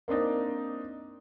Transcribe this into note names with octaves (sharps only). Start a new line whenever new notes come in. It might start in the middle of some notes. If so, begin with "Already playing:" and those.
A#3 C4 D4 D#4 D5